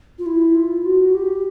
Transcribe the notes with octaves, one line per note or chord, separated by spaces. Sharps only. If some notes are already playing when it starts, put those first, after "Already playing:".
F4
E4
F4
F#4
G4